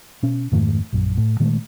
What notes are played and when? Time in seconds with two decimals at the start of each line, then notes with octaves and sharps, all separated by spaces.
0.23 B2 C#4
0.52 F2 G#2 D#3 A3
0.93 A#1 F#2
1.17 A2
1.40 A#2 D#3 G#3 A3